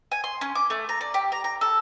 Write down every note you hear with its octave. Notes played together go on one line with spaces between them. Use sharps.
G#5
C6
C#4
D6
A3
A#5
D5
G4
A#5
A#5
A4